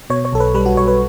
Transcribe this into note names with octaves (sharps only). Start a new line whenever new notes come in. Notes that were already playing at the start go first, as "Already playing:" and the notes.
B2 C#5
C#5
B1 A4
B4
G3 B4
F#4
B1 C#5
B4